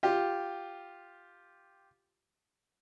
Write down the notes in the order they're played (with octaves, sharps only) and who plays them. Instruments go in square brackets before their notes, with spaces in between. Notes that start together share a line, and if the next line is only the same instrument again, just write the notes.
[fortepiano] F4 G4